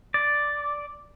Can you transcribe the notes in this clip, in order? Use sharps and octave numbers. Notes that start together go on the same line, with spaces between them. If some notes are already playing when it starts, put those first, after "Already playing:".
D5